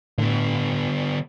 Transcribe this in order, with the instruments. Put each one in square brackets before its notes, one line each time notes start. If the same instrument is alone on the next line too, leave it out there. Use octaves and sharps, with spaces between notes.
[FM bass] A2 [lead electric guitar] D3 B3